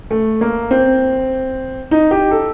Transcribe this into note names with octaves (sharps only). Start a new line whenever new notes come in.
A3
A#3
C4
D#4
G4
A4